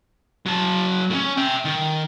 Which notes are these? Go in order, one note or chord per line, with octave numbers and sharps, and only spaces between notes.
F#3 A5
A2 C#4
E5 G5
D#3